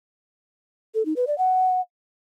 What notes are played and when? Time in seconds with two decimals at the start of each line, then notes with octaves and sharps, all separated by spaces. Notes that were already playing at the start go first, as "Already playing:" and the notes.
0.95 A4
1.05 D#4
1.16 B4
1.27 D5
1.38 F#5